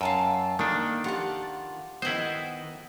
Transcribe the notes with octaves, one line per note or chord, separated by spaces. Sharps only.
F#2 F5 A5 E6
D#3 A#3 D4
F4 G4 F#5 A5
D#3 B3 E4 F#4 C5 D#5